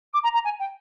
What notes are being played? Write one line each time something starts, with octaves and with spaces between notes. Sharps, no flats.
D6
A#5
A#5
G#5
G5